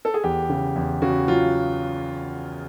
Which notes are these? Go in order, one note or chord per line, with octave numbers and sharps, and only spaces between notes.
A4
G#4
E2 G4
C#3
E2
C#3 F#4
F#3 F4